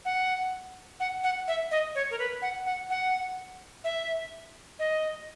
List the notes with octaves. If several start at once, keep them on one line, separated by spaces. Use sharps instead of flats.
F#5
F#5
F#5
E5
D#5
C#5
A#4
B4
F#5
F#5
F#5
E5
D#5